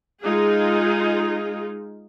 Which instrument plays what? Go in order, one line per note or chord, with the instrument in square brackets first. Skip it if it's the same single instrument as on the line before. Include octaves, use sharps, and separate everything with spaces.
[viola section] G#3 D#4 F4 G#4